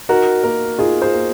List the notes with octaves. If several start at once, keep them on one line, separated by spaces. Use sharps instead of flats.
D#4 F#4 A#4
A#3 F#4 A#4
D#4 F4 G#4
G#4 C5
A#3